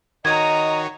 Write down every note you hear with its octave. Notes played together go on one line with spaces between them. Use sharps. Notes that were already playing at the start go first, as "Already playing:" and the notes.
D#3 F#4 C#5 D#5 A#5 D#6 G#6